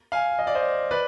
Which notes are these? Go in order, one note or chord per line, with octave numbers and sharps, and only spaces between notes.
F5 G#5
D#5
D5
C5 D#5
B4 D5